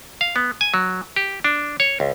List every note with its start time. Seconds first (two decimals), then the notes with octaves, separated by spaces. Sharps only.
0.21 F5
0.36 B3
0.61 G#5
0.74 F#3
1.16 G4
1.44 D4
1.80 C#5
2.00 C#2